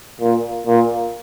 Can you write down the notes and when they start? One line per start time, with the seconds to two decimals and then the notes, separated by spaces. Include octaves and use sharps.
0.21 A#2
0.67 A#2